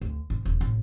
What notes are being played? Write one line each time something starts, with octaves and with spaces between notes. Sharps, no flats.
D2
G#2
D#1
A1